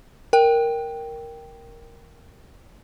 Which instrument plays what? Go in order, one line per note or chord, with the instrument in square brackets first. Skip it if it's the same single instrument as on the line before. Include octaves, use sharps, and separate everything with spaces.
[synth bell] A#4 G5